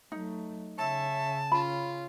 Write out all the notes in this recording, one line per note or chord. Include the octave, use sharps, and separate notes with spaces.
F#3 A3 D#4
C#3 C#5 E5 A5
C#4 F4 B5